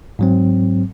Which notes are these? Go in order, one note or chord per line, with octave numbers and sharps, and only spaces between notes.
G#2 F#3 C4